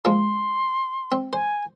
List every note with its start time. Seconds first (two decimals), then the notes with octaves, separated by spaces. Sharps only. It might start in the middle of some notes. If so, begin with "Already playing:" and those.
0.05 F3 G#3 A#3 C6
1.12 C4
1.33 C5 G#5